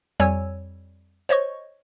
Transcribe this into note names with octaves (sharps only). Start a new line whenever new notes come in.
F2 G3 C#5 G#5 E6
C5 C#5 D#5 C#6